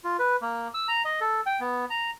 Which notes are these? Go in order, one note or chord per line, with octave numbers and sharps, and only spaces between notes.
F4
B4
A#3
E6
A#5
D#5
A4
G5
B3
A#5